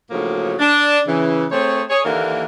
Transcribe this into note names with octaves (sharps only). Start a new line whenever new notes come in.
D2 A2 C#3 F3 F#3 A#3
D4
C#3 E3
A3 C4 G#4 C5 C#5
G#4 C#5
D#2 D3 E3 A#3 A#4 D5